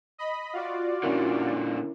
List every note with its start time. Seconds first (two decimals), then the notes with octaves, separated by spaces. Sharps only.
0.18 D#5 B5
0.53 F4 F#4 D5
1.03 A#2 D3 C#4 E4 A#4